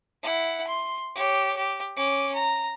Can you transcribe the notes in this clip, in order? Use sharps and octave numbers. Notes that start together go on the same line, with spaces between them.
E4 F#5
C6
G4 C#5
G4
C#4 D6
A#5